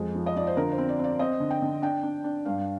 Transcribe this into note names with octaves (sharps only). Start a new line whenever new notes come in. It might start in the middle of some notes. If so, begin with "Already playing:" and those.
Already playing: F2 G#3
F3
D#5
F3 D5
C5
D3 A#4
C5
C4
D5
C4 D5
C4 D#5
D3
G5
D3
D4 G5
D4
D4
G2 F5